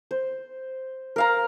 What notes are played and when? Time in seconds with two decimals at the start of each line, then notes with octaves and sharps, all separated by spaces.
0.11 C5
1.16 A#4 F5 A#5